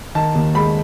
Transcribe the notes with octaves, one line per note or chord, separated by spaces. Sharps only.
D#3 A5
D#2
G#3 B5